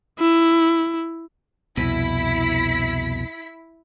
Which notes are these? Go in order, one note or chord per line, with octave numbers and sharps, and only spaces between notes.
E4
C2 F2 B2 E4 B6